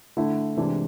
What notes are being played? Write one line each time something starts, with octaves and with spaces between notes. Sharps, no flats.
D3 A3 E4
C3 E3 G#3 D4